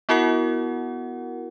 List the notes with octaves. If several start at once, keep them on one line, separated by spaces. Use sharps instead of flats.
B3 E4 F#4 A#4 F#5